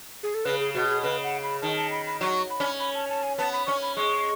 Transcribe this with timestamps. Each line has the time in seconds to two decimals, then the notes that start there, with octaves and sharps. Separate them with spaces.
0.23 G#4
0.35 A4
0.45 C#3 B4
0.60 G#4
0.75 B2 F#4
0.89 G#4
1.03 C#3 B4
1.24 F#5
1.43 B5
1.62 D#3 A5
1.77 A5
1.91 B5
2.07 B5
2.21 F#3 C#6
2.50 B5
2.60 C#4
2.80 B5
2.95 A5
3.09 A5
3.23 G#5
3.38 B3 A5
3.53 B5
3.67 C#4 C#6
3.82 B5
3.96 G#3 C#6